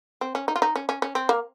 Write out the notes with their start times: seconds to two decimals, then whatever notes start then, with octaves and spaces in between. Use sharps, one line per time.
0.21 C4
0.35 C#4
0.48 D#4
0.56 F4
0.62 D#4
0.76 C#4
0.89 C#4
1.02 C#4
1.15 C4
1.29 A#3